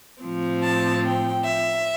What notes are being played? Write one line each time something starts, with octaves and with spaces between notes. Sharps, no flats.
A2 F3 C4
A5
G5
E5